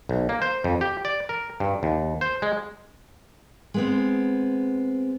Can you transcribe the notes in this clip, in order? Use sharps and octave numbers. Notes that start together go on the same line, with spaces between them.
B1
A#3
C5
F2
G4
D5
A#4
G2
D#2
C5
G#3
G#3 B3 C4